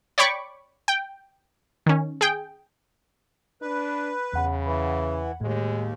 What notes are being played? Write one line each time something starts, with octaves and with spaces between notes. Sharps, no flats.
C#5 D5 G5 B5 C#6 D6
G5
D#3 C#4
G#4 G5
D4 B4
E2 C#3 F#5 B5
E3
D#2 A2 G#3